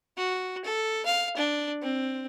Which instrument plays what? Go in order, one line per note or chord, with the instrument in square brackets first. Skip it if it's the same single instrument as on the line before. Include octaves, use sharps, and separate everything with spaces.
[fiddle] F#4
A4
F5
D4
C4